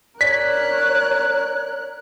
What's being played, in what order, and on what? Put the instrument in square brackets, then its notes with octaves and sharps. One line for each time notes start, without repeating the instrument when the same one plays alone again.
[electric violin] A#4 F#6 [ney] C#5 [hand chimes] D5 [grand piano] B6